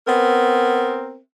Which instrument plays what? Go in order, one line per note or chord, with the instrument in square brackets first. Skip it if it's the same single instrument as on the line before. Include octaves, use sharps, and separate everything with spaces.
[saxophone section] B3 C4 A#4